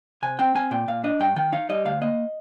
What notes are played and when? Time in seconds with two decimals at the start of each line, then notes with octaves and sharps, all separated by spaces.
0.22 C3 G#5
0.39 C4 G5
0.55 C4 G#5
0.71 A#2 G5
0.88 A#2 F5
1.04 D4 D#5
1.20 G2 G5
1.36 D#3 G5
1.52 D#4 F5
1.69 G3 D#5
1.85 D2 F5
2.01 A#3 D#5